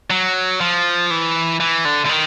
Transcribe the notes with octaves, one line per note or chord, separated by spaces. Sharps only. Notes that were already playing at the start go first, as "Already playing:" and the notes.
F#3
F3
E3
E3
D3
D3
D#3